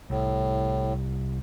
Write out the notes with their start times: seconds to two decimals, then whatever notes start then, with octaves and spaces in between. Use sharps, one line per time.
0.10 C2 A2